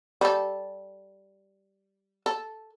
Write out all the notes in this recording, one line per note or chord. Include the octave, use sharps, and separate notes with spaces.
G3 A4
A4